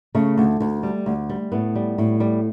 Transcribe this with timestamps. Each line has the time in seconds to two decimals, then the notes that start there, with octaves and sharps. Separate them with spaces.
0.15 C#3 A3
0.38 D2
0.61 D2
0.83 G3
1.06 D2
1.29 G3
1.52 A2 B3
1.75 G3
1.98 A2
2.20 G3